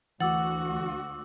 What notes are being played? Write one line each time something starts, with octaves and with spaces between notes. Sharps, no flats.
D2 E3 F#4 F#5 D6 E6 A6 F#7